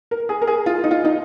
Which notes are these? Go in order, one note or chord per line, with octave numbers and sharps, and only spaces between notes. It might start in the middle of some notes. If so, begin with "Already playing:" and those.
A#4
G#4
A#4
G#4
F4
D#4
F4
D#4